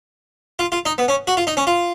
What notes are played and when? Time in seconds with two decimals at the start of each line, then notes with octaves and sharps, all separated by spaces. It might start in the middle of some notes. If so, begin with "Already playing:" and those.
0.59 F4
0.72 F4
0.86 D#4
0.98 B3
1.08 C#4
1.27 F#4
1.37 F4
1.47 D#4
1.57 C#4
1.67 F4